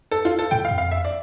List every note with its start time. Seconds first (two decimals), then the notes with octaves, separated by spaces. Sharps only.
0.11 A4
0.25 F4
0.39 A4
0.51 A2 G5
0.65 F5
0.71 F2
0.78 F5
0.91 E5
1.05 D5